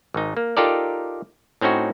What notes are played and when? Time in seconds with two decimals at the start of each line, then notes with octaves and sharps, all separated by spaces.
0.14 G#1 D#4
0.37 A#3
0.57 D#4 F4 G4 A4 A#4 D5
1.61 A2 C4 C#4 D#4 F#4